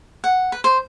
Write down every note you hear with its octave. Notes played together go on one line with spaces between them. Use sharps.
F#5
B4
C5